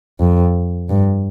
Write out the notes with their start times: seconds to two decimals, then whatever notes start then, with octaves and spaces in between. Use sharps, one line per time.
0.20 F2
0.89 G2